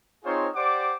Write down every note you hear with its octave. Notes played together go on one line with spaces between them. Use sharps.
C4 D#4 F4 G#4 C5 C#5
G4 C5 D5 F#5 D6